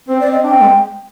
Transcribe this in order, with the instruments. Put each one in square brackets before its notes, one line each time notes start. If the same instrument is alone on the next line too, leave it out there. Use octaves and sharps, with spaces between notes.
[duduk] C4 [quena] C5
[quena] D5
[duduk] C4
[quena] D#5
[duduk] D4 [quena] G5
[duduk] C4
G#3